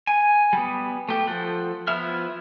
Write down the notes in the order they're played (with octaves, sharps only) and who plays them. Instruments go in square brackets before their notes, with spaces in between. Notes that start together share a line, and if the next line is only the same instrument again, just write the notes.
[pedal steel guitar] G#5
G3 B3
A3 G4
F3 A4 F#5
F3 B3 E4 E5 F6